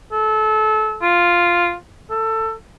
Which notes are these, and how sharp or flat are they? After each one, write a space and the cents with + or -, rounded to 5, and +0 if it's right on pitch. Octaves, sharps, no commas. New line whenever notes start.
A4 -25
F4 -5
A4 +20